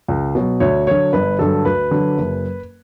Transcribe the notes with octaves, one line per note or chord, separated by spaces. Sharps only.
C#2
B2 F#3
D2 C#5
D3 F#3 C#5
G1 B4
G2 D3 F#3 A4
D2 B4
D3 F#3
F#1